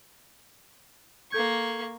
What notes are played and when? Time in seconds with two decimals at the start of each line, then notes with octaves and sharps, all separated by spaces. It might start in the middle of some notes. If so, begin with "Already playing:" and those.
1.32 A#3 A4 C#6 G6 G#6